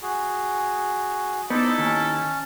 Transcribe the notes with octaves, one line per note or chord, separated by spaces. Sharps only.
F#4 G#4
B3 D#4 E4 A4 C5 D5 D#5
D#2 C#4 A5